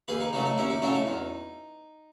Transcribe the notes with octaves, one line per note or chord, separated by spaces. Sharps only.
D#2 G#4 B4
D#4
C#3 F#3 A3 D#4
D#4
D#2 C#4 E4
D#4
C#3 F#3 A3 C#4 E4
D#4
E2